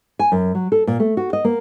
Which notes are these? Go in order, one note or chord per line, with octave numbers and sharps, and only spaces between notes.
G#5
F#2
F#3
A4
A#2
A3
F#4
D#5
A#3